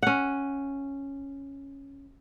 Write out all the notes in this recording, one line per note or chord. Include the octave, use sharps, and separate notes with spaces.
C#4 F#5